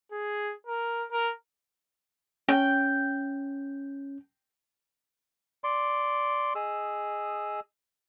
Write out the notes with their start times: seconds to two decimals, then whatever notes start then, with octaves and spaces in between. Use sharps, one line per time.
0.12 G#4
0.67 A#4
1.12 A#4
2.49 C#4 G5
5.64 D5 C6
6.55 G#4 D#5 E6